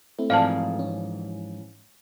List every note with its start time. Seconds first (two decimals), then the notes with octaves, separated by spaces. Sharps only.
0.19 A3 C4 E4
0.30 G#2 E3 F3 D5 F5 A5
0.79 C#4